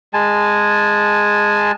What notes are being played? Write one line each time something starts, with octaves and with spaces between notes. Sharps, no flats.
G#3 G#5 A5